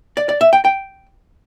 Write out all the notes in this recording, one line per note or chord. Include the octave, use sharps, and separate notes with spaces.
D5
D5
E5
G5
G5